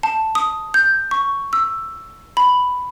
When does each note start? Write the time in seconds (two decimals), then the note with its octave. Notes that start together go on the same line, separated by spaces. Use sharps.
0.03 A5
0.35 D#6
0.74 G6
1.11 C#6
1.53 E6
2.37 B5